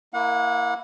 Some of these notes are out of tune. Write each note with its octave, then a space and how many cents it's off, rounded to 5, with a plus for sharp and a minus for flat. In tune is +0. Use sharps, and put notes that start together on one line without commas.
A#3 +0 E4 +0 F#5 -35